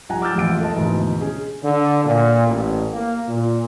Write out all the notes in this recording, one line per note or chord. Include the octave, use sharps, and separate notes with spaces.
C2 F3 F#5 G#5 A#5
D6 E6 F6 G6 A6
E1 A1 F2 F4 F#5 D7
A4 A#4 D#5 A5
G#1 D2 G#2 B2 E3
C#4 G#4
D3
A#2
A1
A#3
A#2